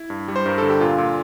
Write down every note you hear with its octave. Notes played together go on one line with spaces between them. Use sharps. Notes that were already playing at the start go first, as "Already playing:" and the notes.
Already playing: E4
G2
G3
C5
G2 A#4
D3 A4
G4
A#2 F4
A#2